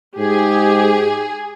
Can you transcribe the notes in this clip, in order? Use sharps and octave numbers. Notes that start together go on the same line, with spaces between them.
G#2 G4 G#4